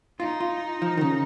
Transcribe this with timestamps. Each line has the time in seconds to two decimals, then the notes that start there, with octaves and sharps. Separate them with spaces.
0.20 D#4 F4
0.40 F4
0.82 F3
0.97 D#3
1.01 C#3